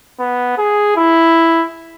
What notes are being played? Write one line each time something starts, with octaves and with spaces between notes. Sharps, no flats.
B3
G#4
E4